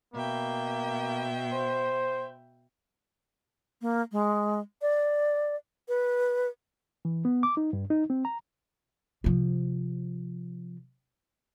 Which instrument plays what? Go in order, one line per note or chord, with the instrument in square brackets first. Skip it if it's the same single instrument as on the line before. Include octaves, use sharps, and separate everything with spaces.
[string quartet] B2 E5 G5 [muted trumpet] A#3
[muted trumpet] C5
[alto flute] A#3
G#3
D5
B4
[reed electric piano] E3
B3
D6
D#4
G2
D#4
C4
A#5
[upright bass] C3 F3